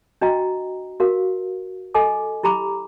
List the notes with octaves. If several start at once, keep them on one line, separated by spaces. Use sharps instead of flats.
D4 F#4 D#5 G5 A#5
F#4 A#4 F5
A4 D#5 G#5 D6
E4 G4 A#5 B5 D6